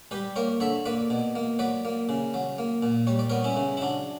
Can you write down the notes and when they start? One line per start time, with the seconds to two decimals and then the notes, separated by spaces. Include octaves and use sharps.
0.11 G3 G4 B4
0.36 A#3 A#4 C#5
0.60 D3 C#5 E5
0.86 A#3 B4 D5
1.10 B2
1.35 A#3
1.59 F#3 B4 D5
1.85 A#3
2.09 C#3
2.34 F#3
2.58 A#3
2.83 A#2
3.07 G3 C#5
3.19 D5
3.30 B3 A#4 C#5
3.44 C#4 E4
3.56 C#3
3.77 E4
3.81 F#3 D4